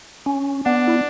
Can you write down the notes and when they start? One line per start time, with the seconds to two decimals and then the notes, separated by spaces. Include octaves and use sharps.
0.26 C#4
0.65 B3 D4
0.88 E4